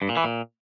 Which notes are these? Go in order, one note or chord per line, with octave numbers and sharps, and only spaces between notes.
G2
A#2
E3
A#2